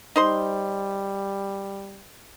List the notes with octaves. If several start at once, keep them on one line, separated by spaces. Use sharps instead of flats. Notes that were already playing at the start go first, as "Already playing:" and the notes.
G3 D#4 C5 C6